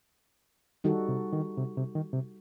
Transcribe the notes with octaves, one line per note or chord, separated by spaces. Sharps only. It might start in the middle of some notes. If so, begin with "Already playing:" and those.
D#3 G3 D#4 F#4 A4
C3
D#3
C3
C3
D#3
C3